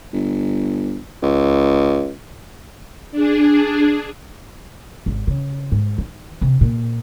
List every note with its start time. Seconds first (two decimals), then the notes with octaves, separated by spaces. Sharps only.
0.13 G1
1.22 C#2
3.11 D4 G#4
5.06 G#1
5.27 C#3
5.72 G#2
5.98 D#3
6.41 C3
6.61 A#2